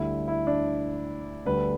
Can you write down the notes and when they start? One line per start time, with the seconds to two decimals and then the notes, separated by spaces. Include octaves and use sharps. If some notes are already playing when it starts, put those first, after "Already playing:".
Already playing: D2 D3 G3 E4
0.28 E4
0.47 D4
1.45 D2 D3 G3 B4